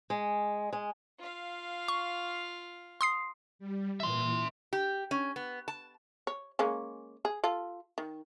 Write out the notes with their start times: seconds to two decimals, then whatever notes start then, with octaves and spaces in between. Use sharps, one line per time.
0.10 G#3
0.73 G#3
1.19 F4 F5
1.88 C#6
3.01 C6 D#6 C7
3.59 G3
4.00 A#2 E3 E5 C6
4.73 G4
5.11 C#4
5.36 B3
5.68 A5
6.27 C#5
6.59 G#3 A#3 C#4
7.25 G#4
7.44 F4 A4
7.98 D#3